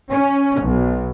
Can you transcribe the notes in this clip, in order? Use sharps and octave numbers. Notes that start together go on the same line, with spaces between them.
C#4
B1